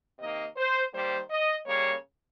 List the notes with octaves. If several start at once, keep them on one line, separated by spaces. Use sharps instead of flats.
C3 D#3 A#3 D#5
C5
D#3 G3 A#3 C5
D#5
C#3 G3 A#3 C#5